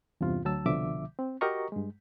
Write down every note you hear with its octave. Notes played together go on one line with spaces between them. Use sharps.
E2 G2 C3 F4
D2 F#3 A5 E6
C2 B2 D3 F3 E5 D6
C4
F#4 G4 A#4 D#5 A#5 C#6
G2 G#3